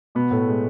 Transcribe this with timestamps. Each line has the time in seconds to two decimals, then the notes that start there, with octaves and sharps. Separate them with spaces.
0.15 B2 B3
0.31 A2 A3
0.48 G#3